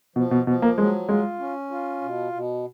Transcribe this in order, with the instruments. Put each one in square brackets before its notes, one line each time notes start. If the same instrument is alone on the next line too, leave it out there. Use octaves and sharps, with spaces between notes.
[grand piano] B2 [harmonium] F3
[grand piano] B2
[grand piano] B2 [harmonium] F3
[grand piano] A#3
[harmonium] F#3 [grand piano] G#3
[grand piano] G#3 [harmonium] F4
[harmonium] C#4
F4
B2
B2